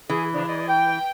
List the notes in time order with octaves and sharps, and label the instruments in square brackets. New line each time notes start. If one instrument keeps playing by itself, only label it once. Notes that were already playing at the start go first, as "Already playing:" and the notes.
[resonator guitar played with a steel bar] E3 [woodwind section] G#4
[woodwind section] C#3 F3 D4
G#4 D5 D#5
G5